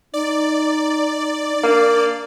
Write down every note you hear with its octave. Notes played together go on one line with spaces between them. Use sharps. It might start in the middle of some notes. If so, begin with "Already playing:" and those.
D#4 D5
A#3 D4